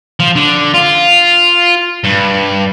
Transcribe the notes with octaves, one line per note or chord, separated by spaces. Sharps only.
F3
D3
F4
G2